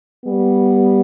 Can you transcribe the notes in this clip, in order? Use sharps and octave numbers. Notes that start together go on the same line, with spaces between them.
G3 B3